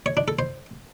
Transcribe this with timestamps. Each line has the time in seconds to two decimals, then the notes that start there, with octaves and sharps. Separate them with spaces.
0.06 C#5
0.17 D4
0.28 A4
0.39 C5